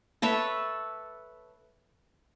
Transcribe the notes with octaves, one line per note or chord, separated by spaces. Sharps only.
A4 B4 C#5 E5